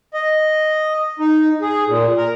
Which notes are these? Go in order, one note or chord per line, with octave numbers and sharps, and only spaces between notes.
D#5
D#4
G#4
A#2
A#4